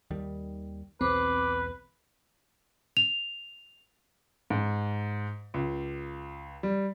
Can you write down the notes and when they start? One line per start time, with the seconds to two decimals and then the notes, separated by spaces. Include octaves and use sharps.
0.10 D#2 D#3 G3
1.01 B1 E2 C4 B4 D6
2.97 F7
4.50 G#2
5.54 C#2
6.63 G3